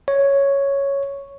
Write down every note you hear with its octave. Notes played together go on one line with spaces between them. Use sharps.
C#5